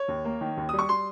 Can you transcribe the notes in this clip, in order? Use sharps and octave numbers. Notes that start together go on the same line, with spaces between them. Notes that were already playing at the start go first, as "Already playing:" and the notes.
Already playing: C#5
D#2
A#3
D#3
D#2
G3 D#6
C#6
G3 C6